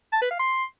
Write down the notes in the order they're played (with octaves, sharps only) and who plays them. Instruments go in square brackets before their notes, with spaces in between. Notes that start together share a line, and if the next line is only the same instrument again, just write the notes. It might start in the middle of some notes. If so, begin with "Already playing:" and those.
[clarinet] A5
B4
F5
C6